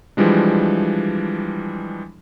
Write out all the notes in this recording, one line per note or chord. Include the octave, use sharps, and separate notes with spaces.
E3 F3 G3 G#3 D4